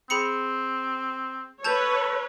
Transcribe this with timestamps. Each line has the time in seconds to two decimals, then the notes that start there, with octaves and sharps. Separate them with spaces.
0.10 C4 G#4 B5 C#7
1.64 A4 B4 C#5 A5 G6 F7